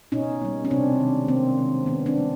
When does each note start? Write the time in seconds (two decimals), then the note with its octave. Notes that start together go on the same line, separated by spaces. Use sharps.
0.12 B2 C#4 D#4
0.41 G3 A#3
0.65 C#4
0.70 C3 C4 D4
1.00 D#3 G#3
1.28 C3 A#3 C4
1.58 D#3 G#3
1.86 D#3 B3 C#4
2.06 C4 D4
2.16 G3 A#3